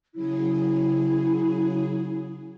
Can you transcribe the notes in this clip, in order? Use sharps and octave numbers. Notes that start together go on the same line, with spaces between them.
C#3 F#3 E4 G#4